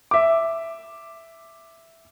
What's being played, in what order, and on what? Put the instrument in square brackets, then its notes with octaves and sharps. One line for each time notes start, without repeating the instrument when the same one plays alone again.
[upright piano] E5 D6